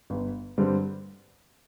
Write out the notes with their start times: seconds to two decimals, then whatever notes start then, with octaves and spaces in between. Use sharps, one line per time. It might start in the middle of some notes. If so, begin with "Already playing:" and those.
0.10 G1
0.58 G2 D3 G3 C4